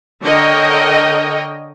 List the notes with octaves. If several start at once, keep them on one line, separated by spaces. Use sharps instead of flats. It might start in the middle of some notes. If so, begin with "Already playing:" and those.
D3 A#4 C#5 D#5 G5